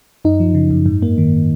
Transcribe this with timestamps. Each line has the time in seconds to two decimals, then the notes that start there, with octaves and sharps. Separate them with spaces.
0.25 F#2 D#4
0.40 F3
0.55 C#3
0.71 F#2
0.86 G#2
1.02 A#3
1.18 D#3